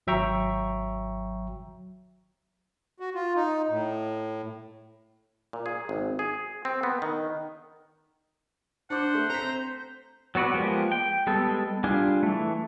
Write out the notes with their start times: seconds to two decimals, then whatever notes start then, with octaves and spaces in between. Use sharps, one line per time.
0.07 G#1 F#3 E5 G5 A#5 C#6
3.00 F#4
3.15 F4
3.36 D#4
3.69 A2
5.53 A#2
5.66 G#4
5.89 G#1
6.19 G#4
6.65 C4
6.83 B3
7.02 D#3
8.90 D4 C5 F#5 D6
9.15 A3
9.30 C4 A#5 B6
10.35 F#3 B3 F#4 B4 D5
10.54 F3 G#3 A#3 B3 G4
10.92 G5
11.27 G3 G#3 B3 A4
11.84 G3 D4 F4 G#4
12.23 E3 A3